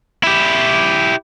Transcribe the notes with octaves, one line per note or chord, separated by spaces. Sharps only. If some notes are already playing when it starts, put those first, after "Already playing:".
E4 G4